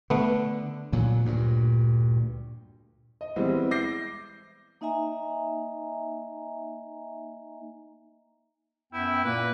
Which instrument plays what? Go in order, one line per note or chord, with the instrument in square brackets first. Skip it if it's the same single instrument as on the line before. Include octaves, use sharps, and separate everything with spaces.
[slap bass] D3 [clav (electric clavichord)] A3 B3
[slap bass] D2 A#2 F#3
D2 G2 A#2
[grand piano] D#5
E3 G3 G#3 B3 C4
D6 G6 A#6 C7
[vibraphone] A#3 D#4 D#5 E5 G#5 A#5
[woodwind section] F#2 B3 G5 [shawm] E4
[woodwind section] A#2 A#3 [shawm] B4